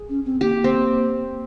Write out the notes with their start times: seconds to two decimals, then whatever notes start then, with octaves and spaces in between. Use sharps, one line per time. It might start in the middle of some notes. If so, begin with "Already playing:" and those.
Already playing: G#4
0.09 C#4
0.25 C4
0.41 A#3 G4
0.64 C4